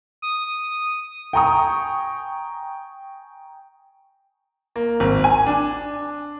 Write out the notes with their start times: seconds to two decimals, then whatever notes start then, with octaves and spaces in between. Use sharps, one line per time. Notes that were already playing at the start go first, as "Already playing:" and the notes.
0.22 D#6
1.33 G5 G#5 A#5 C#6 D#6
4.76 A#3
5.00 G#1
5.24 G#5
5.47 D4